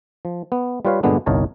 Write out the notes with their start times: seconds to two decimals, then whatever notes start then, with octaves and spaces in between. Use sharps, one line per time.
0.25 F3
0.52 B3
0.85 G3 F4 B4 C#5 F5
1.03 G2 A#2 D3 G#3 B3 D4
1.26 G1 C2 D#4 A#4 C#5 A5